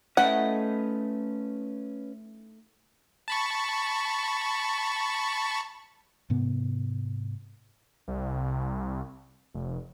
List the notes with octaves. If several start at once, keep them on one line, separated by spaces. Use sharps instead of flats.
A3 C#4 D#4 E4 B4 F#5
A5 B5 C#6
G#2 C3 B3
C2
F1